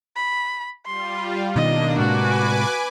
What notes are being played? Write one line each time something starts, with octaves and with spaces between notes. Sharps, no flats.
B5
G3 F4 C6
B2 D#3 A#3 D4 D#5
A2 C3 G#3 F#4 B4 G#5 D6